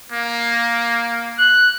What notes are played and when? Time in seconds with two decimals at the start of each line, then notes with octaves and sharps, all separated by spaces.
0.12 A#3
1.39 F#6